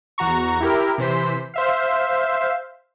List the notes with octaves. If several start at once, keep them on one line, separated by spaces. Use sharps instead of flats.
E2 F#4 A#5 C#6
E4 G4 A#4
C3 E3 C5 B6
C5 E5 F5